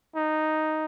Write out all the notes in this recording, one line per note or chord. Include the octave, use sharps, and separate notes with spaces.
D#4